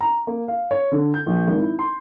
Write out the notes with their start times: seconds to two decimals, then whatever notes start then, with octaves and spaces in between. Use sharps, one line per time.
0.01 A#5
0.27 A#3
0.48 F5
0.71 C#5
0.92 D3
1.14 G6
1.26 A#1
1.47 G#1
1.59 E4
1.79 C6